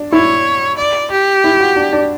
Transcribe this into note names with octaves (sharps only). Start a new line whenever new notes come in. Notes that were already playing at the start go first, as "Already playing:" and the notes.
Already playing: D4
E4 C#5
D5
G4
E4
F#4
D4
D4